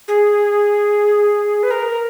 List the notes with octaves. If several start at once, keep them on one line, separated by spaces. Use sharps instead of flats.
G#4
B4
A#4